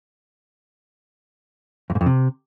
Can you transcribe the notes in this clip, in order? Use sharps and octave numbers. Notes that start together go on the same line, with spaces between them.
F2
G#2
F2
C3